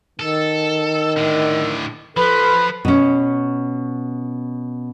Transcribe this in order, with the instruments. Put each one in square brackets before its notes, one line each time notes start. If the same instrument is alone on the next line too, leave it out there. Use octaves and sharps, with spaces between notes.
[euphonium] D#3 [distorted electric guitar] A4
[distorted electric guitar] A2 D3
[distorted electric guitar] F3 [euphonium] A4 [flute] B4 [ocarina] B5
[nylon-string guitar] B2 C#4